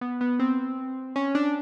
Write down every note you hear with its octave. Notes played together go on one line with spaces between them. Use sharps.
B3
B3
C4
C#4
D4